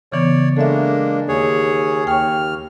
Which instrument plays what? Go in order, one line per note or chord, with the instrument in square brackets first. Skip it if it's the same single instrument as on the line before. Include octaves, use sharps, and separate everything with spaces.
[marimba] C#3 E3 B3 [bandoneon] C#5 D5
[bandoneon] G#3 A#3 D4 [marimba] A4 E5
[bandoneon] D#2 G#4 C#5
[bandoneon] D#2 F6 [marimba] G5 C#6